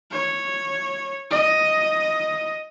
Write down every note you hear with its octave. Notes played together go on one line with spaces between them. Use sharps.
C#5
D#5